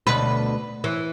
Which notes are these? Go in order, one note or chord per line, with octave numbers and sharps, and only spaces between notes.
D2 B2 B4
E3